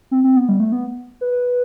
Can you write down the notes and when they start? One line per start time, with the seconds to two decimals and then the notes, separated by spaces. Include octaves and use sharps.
0.11 C4
0.24 C4
0.37 B3
0.49 G3
0.60 A3
0.72 B3
1.21 B4